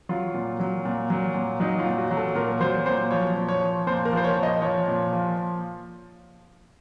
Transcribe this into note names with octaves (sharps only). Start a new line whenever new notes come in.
F#3 F4
A#2
F#3
A#2
F#3
A#2
F#3 D#4
F4
A#2
F#4
F#3
A4
A#2 A#4
F#3 C5
A#2 C5
F3 C#5
A#2
C#5
F3
A#2 C5
A#4
F3
C5
C#5
A#2
D#5
F3 C#5
A#2
F3